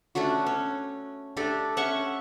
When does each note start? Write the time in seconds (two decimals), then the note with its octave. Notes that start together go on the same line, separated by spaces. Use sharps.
0.15 A3 C#4 D4 F#4
0.46 C#4
1.37 A3 D4 G4 A4
1.77 C#4 E5 F#5 C#6